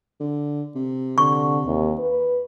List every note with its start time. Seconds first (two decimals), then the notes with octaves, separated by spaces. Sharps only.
0.20 D3
0.75 C3
1.18 D3 C#6
1.66 D#2
1.99 B4